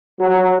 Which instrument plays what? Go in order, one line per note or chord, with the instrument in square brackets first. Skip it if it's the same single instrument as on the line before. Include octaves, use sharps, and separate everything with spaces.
[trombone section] F#3